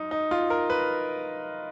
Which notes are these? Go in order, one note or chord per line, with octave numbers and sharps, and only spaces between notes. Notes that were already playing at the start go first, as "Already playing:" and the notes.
Already playing: F#2 D#4
D#4
F4
A#4
B4